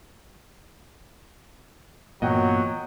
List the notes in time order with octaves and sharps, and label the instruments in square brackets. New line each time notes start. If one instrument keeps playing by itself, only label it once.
[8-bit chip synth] G2 E3 B3 [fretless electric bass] A#2 [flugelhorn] F#3 [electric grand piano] D#5 F#5 G5